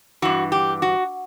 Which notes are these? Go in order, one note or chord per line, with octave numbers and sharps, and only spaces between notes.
G2 E3 F#4
G4
F#4